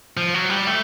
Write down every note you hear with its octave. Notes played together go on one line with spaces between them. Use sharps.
F3
F#3
G3
A3